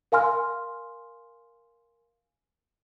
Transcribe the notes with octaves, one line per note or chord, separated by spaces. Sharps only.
A#4 F5 G#5 C6 F6